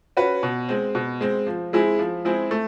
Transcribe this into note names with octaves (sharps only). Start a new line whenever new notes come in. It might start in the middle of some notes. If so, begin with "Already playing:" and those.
C#4 F#4 B4
B2
G#3 C4
B2
G#3 C4
F3
G#3 C4 E4 G#4
F3
G#3 C4 E4 G#4
A3